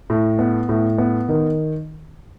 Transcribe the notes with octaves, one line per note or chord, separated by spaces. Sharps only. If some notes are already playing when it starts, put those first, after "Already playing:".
A2
B3
A2
B3
D#3